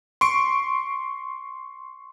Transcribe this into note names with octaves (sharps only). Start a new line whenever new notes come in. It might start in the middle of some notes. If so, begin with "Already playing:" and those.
C6 C#6 D7